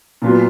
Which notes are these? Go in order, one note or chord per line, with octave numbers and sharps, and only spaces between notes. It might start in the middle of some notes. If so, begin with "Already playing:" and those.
A#2 F#3 B3 F4